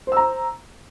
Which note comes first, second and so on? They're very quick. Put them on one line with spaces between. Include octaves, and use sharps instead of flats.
C5 E6 A#5